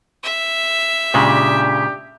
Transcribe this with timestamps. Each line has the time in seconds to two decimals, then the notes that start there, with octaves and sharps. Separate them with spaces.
0.24 E5
1.14 A#2 C#3 G#3 D4 G4